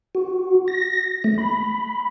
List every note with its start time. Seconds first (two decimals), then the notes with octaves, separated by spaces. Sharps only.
0.15 F#4
0.68 A#6
1.24 A3
1.38 B5